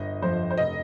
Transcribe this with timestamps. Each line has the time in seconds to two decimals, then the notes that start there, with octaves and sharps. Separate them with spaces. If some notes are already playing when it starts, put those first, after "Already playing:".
Already playing: G1 D#5
0.22 F2 F3 C5
0.51 C5
0.58 F1 D#5